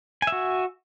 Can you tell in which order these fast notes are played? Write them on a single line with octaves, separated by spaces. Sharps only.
G#5 E5 F#4